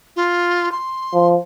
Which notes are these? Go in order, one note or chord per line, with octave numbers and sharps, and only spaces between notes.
F4
C6
F3